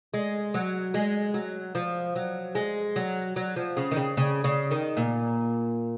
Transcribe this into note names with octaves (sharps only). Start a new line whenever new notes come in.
G#3
F#3
G#3
F#3
F3
F#3
G#3
F#3
F#3
F3
C#3
D#3
C#3
C#3
C#3
D#3
A#2